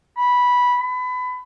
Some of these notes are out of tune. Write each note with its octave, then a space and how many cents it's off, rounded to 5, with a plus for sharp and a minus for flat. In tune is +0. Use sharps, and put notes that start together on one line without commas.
B5 -10
B5 +25